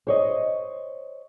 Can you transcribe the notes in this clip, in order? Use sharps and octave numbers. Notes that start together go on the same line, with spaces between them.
C5 C#5 D#5